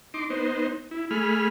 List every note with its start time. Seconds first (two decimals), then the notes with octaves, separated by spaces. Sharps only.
0.14 D#4 C6 D6
0.30 B3 D#4 C5
0.91 E4
1.11 A3 G#4 B5 F6